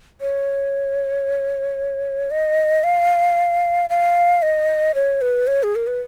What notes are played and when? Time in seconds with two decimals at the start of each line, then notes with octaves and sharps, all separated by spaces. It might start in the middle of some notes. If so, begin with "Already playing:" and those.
0.21 C#5
2.31 D#5
2.84 F5
3.90 F5
4.42 D#5
4.95 C#5
5.21 B4
5.47 C#5
5.63 G#4
5.76 A#4
5.87 B4